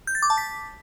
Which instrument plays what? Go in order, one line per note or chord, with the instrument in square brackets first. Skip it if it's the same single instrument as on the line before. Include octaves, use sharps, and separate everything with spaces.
[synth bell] G6
A6
D6
A5
B6